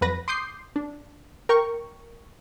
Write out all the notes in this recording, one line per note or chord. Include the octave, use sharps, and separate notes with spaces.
F2 F#3 B4 A#6
C6 D6 D#6 G6 C7
D4
A#4 G5 C#6